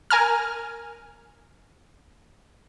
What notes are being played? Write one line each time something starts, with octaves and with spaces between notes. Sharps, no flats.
A#4 G#5 A#5 F6